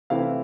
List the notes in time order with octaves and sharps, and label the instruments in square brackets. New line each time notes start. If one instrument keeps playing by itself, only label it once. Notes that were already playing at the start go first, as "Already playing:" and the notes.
[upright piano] C3 E3 A3 C4 E4 F5